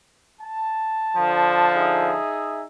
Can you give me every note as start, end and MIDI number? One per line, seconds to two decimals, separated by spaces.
0.42 1.70 81
1.16 2.14 50
1.16 2.14 53
1.75 2.64 63
1.75 2.64 68
1.75 2.64 76